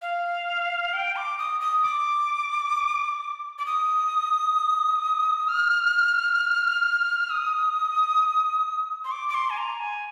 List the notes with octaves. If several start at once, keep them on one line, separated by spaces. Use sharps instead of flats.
F5
G5
D6
D#6
D#6
D6
D6
D#6
F6
D#6
C6
D6
D6
C6
G#5
A#5
G#5